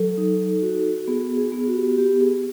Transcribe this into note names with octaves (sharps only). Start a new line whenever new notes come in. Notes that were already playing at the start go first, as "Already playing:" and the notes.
Already playing: F#3 A4
D#4
F#4
B3 G#4
G#4
B3
F#4
G4
F#4
B3 G4
G#4